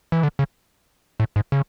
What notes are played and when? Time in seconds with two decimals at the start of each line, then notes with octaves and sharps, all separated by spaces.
0.12 E3
0.23 D3
0.39 C#3
1.20 A2
1.36 G#2
1.52 C#3